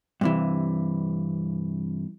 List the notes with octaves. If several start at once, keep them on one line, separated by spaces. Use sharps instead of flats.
G2 C3 E3